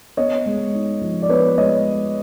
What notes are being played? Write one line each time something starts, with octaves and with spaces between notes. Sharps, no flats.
B3 C#5 D#5
G#3
D#4
F3
D5
B3 B4 C#5
G#3 C#5 D#5